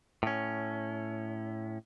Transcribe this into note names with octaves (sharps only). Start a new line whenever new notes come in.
A2 C#4